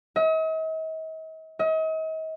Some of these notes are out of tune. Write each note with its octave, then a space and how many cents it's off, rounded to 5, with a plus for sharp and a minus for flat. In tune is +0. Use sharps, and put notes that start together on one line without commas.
D#5 +45
D#5 +40